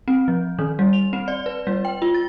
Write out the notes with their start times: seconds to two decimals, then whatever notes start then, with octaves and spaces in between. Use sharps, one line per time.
0.08 C4
0.28 F3
0.59 D#3
0.79 G3
0.93 F7
1.13 C4
1.28 D5
1.46 B4
1.67 G3
1.85 G5
2.02 F4
2.14 A6